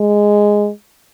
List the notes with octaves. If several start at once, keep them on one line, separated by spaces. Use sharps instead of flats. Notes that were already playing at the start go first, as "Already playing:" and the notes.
Already playing: G#3